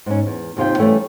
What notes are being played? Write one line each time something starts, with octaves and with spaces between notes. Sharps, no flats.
G#2 C#4
E2
D#2 C3 F4 G4 G5
E3 G3 A3 C#4